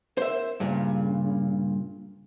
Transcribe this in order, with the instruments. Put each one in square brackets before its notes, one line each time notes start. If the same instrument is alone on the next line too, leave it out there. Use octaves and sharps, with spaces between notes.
[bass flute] A#4 [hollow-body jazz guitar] C5 E5
[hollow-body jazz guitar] G2 A#2 [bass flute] C#3